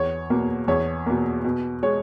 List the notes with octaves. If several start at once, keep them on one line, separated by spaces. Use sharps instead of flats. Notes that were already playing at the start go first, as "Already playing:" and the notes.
Already playing: E2 C#5
B2 A#3
E2 C#5
B2 A#3
B2
G#3 C#5